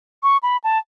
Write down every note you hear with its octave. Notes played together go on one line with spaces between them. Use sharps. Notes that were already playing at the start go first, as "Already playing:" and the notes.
C#6
B5
A5